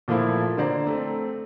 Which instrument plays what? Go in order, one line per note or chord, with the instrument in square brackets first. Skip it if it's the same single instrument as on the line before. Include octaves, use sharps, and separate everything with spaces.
[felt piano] A#2 F3 A3 A#3 E4
D3 C5 D5 A#5
A3 C4